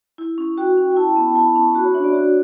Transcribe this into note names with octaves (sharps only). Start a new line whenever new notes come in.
E4
C#4
F#4 G5
C#4
G5
E4 A5
B3 B5
A5
E4 B5
C#4
F#4 B5
C#5
D4 E5
D5
F#4 C#5